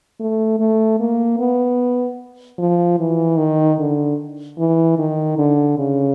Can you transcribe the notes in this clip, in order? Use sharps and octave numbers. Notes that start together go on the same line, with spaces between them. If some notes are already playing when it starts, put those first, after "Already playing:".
A3
A3
A#3
B3
F3
E3
D#3
D3
E3
D#3
D3
C#3